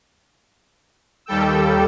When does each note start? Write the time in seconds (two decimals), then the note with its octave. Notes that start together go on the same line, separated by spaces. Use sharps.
1.26 D#2 G3 A4 G5 E6